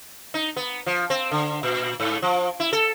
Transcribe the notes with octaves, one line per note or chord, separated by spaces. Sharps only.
D#4
B3
F3
C4
D3
A#2
G#2
F3
E4
A4